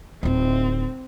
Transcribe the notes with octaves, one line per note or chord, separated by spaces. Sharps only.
D1 C4 D#4